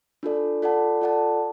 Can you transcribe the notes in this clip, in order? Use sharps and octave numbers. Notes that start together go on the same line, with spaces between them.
D4 F4 A4 D5
F4 A4 D5 F#5 A5
F4 A4 D5 F#5 A5